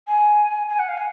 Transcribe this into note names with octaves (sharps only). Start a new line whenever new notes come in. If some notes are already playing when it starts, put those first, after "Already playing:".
G#5
G#5
F#5
F5
G#5